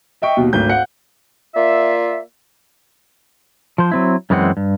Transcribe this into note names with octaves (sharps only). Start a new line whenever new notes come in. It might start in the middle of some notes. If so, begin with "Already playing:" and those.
D#5 E5 G5 C#6
D#2 B2
G#1 D2 G6
F5 F#5 F#6 C#7
A#3 F4 D5 E5
F3 C5
F#3 C4 E4
F#2 E3 G#3 C4 F#5
G2